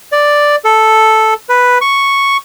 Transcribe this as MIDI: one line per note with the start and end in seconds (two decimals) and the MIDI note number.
0.12 0.56 74
0.65 1.34 69
1.49 1.78 71
1.81 2.37 85